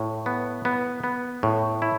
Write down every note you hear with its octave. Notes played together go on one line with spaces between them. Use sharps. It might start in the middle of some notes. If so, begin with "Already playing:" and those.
Already playing: A2
B3
B3
B3
A2
E4